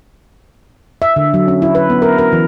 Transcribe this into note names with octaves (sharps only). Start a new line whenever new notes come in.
E5
D3
F#3
C#4
E4
B4
B3
A#4
A#4
E3